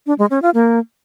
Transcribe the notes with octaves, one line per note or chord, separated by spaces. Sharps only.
D4
G#3
C#4
F4
A#3